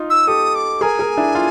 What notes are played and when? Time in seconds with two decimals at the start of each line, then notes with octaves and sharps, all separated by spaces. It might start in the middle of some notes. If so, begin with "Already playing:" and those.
Already playing: D#4 F4
0.10 E6
0.27 G4 A4 D#6
0.55 D6
0.81 G#4 A#4 G#5
0.99 G#4 A#4
1.17 D4 E4
1.35 F4